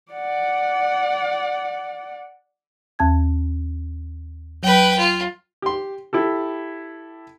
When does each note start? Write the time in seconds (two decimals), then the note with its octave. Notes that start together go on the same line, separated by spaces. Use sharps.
0.12 D5 F#5
2.99 D#2 A5 G#6
4.63 F#3 B4 G5
4.98 F4
5.62 G4 C6
6.13 E4 G4 A4